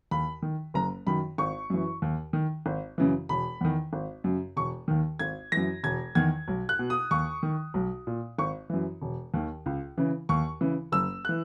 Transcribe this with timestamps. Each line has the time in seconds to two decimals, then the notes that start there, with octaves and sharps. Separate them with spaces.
0.11 D#2 B5
0.42 D#3
0.74 F#1 A#5
1.06 F#2 D#3 B5
1.38 G#1 C#6
1.70 F#2 E3
2.02 D#2
2.33 D#3
2.66 G#1
2.98 F#2 C#3 E3
3.29 E1 B5
3.61 E2 D#3
3.93 G#1
4.24 F#2 C#3
4.57 E1 C#6
4.88 D#2 D#3
5.19 G#1 G#6
5.52 F#2 E3 A#6
5.84 E1 G#6
6.15 E2 D#3 G#6
6.48 B1
6.69 F#6
6.79 B2
6.90 D#6
7.11 D#2 C#6
7.43 D#3
7.74 B1
8.07 A#2
8.38 G#1 C#6
8.70 F#2 E3
9.02 E1
9.34 D#2 D#3
9.66 C#2
9.98 C#3 E3
10.29 D#2 C#6
10.61 C#3 E3
10.92 F#1 E6
11.25 E3 F#6